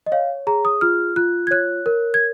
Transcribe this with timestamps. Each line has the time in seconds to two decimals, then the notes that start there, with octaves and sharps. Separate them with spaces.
0.06 D#5
0.12 C#5 F5
0.47 G#4 A#5
0.65 D#6
0.81 F4 F6
1.16 F4 F#6
1.47 G#6
1.51 C#5 F#6
1.86 A#4
2.14 G#6